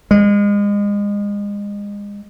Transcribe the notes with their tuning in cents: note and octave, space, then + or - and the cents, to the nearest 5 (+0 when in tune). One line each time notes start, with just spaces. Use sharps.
G#3 -30